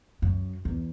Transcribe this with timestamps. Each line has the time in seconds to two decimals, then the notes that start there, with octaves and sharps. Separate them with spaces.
0.22 F#2
0.65 E2